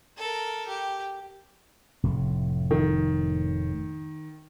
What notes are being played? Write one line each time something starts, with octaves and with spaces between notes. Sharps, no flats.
A4 A#4
G4
F1 A2
D#3